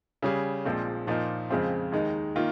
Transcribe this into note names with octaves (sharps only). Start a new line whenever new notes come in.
C#3 G3 C#4 G#4
A#1 A#2 F3 G#3 C4
A#2 F3 A#3 D#4
F2 C#3 G#3 C4 F4
D#2 D#3 G#3 D#4
D#3 A#3 F4